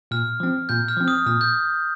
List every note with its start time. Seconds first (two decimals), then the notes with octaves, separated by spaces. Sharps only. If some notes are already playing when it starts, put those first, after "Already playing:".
0.11 A#2 F6
0.40 F3 C4
0.69 A#2 G6
0.88 F6
0.97 F3 C4
1.08 D#6
1.26 A#2 F6
1.41 G6